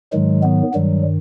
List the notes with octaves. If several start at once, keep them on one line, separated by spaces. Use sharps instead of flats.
G#2 D#3 F#3 G#3
B3
G2 D#3 F#3 G3